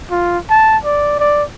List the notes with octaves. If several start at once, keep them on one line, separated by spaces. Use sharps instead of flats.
F4
A5
D5
D5